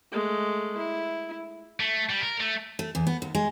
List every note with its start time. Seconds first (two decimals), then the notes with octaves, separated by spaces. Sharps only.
0.12 G#3 A3
0.77 E4
1.80 A3
2.09 G3
2.22 A#4
2.40 A3
2.79 A3
2.95 E2
3.07 B3
3.22 D#2
3.35 G#3